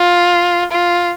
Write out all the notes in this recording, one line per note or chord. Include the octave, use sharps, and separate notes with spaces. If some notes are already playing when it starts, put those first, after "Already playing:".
Already playing: F4
F4